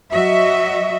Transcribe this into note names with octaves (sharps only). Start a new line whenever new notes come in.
F#3 F#4 D#5 E5